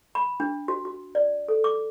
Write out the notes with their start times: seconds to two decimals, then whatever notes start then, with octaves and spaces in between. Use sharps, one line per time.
0.15 B5
0.40 D4
0.68 F#4
0.85 F#4
1.15 D5
1.48 A4
1.64 D6